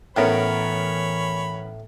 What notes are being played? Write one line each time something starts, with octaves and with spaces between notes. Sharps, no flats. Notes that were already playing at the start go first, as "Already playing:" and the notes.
A2 E3 B3 C#4 A#4 C#5 B5